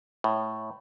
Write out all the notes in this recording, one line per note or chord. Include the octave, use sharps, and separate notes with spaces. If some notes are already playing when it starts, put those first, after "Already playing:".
A2